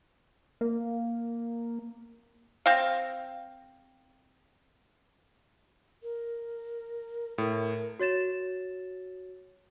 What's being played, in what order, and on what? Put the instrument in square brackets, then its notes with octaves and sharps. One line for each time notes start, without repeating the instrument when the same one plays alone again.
[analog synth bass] A#3
[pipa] C4 F5
[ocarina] A#4
[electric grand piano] A2 [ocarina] A#4
[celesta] F#4 C#5 A6 E7